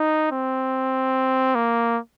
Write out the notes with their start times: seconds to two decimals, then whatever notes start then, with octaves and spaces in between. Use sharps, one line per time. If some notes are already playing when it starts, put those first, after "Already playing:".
Already playing: D#4
0.32 C4
1.55 A#3